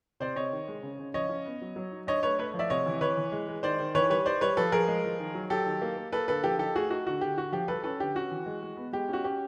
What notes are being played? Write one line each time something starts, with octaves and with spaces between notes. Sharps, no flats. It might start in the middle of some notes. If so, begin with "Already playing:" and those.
C3 C5 D5
C3 C#5 D#5
D#3
G#3
C#3
C#3
F3 C#5 D#5
C#4
B3
F#3
F#3
D#4
D4 C#5 D#5
A3 B4 C#5
A3 B4 C#5
F3
D5 E5
C3 C#5 D#5
E3
E3 B4 C#5
E3
G#3
G#3
D#3 C5 D5
D#3
E3 B4 C#5
G3 B4 C#5
D#4 C5 D5
G3 B4 C#5
F3 A4 B4
F3 G#4 A#4
G#3
F3
D#3
F#3
F#3 G4 A4
D#3
A#3
A#3
A#3 A4 B4
D3 A4 B4
F3 G4 A4
D#4 G4 A4
A3 F#4 G#4
D#4 F#4
D3 F#4
D3 G4
D3 F#4
F3 G4
G3 A4 B4
C#4 A4 B4
D3 G4
C#4 F#4
E3
G#3
G#3
B3
G#3 G4
C#4 F#4
C#4 G4